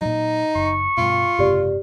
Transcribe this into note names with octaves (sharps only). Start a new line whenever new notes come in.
A#2 F#3 D#4
F#1 C#6
G2 B2 F4
F#1 G#2 C3 G4 D5